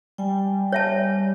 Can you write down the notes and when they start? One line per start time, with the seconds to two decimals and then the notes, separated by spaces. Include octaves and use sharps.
0.18 G3 G5 G#5
0.73 C#5 E5 A5